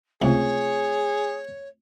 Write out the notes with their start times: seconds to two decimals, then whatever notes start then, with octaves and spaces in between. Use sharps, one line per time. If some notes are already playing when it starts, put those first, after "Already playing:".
0.22 C#2 C3 A3 C4 F4 G#4 C#5